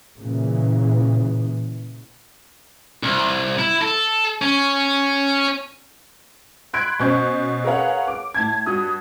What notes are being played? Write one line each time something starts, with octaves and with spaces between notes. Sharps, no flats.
A#2 C#3 E3
C2
E4
A4
C#4
B5 C6 F#6 G#6 D7
B2 C#4 C5 C#6 G6
G#4 A#4 B4 C#5 F5 F#5
D6
A2 A5 G#6
G2 F#4 D#6